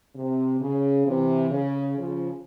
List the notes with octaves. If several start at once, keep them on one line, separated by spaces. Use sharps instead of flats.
C3
C#3
C3 E3
C#3
C#3 F3